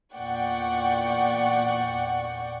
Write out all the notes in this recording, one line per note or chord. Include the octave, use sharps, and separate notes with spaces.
E2 A#2 D5 F#5 G5 C#6